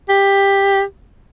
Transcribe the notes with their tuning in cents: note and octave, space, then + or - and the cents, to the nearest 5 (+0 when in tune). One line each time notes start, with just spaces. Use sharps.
G4 +15